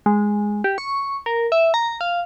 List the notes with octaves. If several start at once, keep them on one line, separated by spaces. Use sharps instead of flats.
G#3
G4
C#6
A#4
E5
A#5
F5